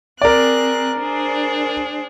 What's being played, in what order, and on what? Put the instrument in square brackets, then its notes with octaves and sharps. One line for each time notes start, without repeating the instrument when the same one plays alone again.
[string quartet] C4 G#4 F#6 [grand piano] A#4 D5
[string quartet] D4 G#4 C5